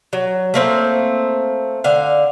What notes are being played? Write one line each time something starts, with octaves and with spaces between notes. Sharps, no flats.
F#3
A3 A#3 C4
D3 F5